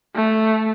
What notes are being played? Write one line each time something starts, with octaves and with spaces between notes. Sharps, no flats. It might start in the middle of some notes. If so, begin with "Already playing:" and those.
A3